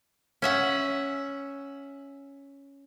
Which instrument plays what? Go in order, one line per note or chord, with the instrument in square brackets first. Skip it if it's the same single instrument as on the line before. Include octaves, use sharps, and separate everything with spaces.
[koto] C#4 E5 F#5